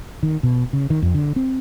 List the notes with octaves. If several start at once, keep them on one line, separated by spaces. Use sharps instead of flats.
D#3
B2
C#3
D#3
F2
D3
C4